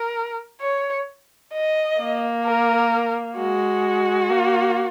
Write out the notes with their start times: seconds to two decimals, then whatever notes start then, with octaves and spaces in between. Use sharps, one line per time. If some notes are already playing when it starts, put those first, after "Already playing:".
Already playing: A#4
0.61 C#5
1.53 D#5
2.00 A#3
2.45 A#4
3.37 G#3 F#4
4.29 A#3